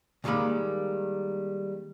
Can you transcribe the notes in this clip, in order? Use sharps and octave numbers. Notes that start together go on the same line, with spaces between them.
D2 D#3 G3 G#3 A#3 B5